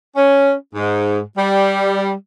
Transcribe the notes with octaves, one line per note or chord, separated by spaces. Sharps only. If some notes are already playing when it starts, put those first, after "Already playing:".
C#4
G#2
G3